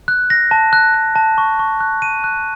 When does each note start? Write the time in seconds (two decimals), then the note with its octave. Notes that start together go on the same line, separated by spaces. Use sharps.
0.08 F#6
0.30 A#6
0.51 A5
0.73 F#6
0.94 F#6
1.16 A5
1.38 C#6
1.59 C#6
1.80 F#6
2.02 D#7
2.24 F#6